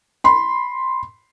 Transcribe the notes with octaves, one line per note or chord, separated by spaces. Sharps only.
B5 C6